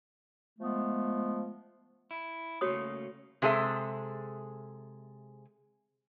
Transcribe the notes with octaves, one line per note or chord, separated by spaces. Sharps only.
F3 G#3 A3 B3
E4
C#3 A3 A#3 F#4 C#5 D#6
C3 G#3 G#4 A4 E5